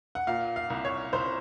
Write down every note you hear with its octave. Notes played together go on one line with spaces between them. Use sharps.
F#5
A#2 F5
F5
C2
C#5
C2 C5